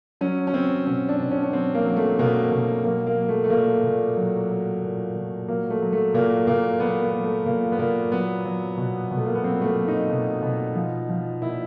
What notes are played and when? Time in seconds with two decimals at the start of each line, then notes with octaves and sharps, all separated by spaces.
0.21 F#3 C#4
0.47 C#4
0.54 F#3 C4
0.87 B2 C#4
1.09 D4
1.20 B2
1.31 C#4
1.43 C#4
1.53 F#3 C4
1.74 A#3
1.86 F#3
1.97 A3
2.19 B2 A#3
2.52 B2
2.85 F#3 A#3
3.07 A#3
3.18 F#3
3.28 A3
3.44 A3
3.50 A#2 A#3
3.83 A#2
4.17 F#3
4.50 F#3
4.82 A#2
5.15 A#2
5.48 F#3 A#3
5.70 A3
5.82 F#3
5.92 A3
6.14 A#2 A#3
6.47 A#2 A#3
6.80 F#3 B3
7.02 A#3
7.13 F#3
7.24 A3
7.46 A#2 A#3
7.72 B3
7.79 A#2 A#3
8.12 F#3 B3
8.45 F#3
8.77 B2
9.11 B2
9.17 A3
9.26 A#3
9.35 B3
9.44 F#3 C4
9.62 A3
9.66 A#3
9.77 F#3
9.88 D#4
10.10 B2
10.43 B2
10.76 F3
11.09 F3
11.42 A#2 E4